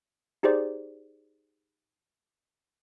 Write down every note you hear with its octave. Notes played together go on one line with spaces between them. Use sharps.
D#4 G4 G#4 C5 D5